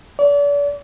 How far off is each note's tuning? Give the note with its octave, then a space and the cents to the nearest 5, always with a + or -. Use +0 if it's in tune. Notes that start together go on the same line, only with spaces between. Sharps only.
D5 -40